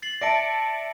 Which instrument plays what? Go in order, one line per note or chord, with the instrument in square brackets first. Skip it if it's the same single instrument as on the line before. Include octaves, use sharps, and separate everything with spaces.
[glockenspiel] A6 C7 F#7
[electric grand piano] D5 E5 A5 [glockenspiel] A#6 C#7 D7